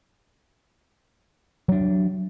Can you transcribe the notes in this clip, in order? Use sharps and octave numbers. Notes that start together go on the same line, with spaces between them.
F#3 D4